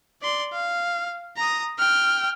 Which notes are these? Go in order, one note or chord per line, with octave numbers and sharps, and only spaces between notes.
D5 C6
F5
A#5 D#6
G5 F6